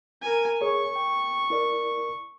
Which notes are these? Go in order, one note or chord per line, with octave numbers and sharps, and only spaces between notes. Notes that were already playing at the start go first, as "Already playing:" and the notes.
A#4 G#5
G#4 C#5 C#6
G5
E4 A#4 D5